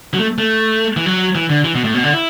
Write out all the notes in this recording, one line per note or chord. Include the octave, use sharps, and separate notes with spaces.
F#3
A3
A3
E3
F#3
E3
D3
E3
B2
A2
B2
D3
E4